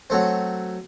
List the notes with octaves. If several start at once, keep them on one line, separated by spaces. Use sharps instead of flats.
F#3 A3 C4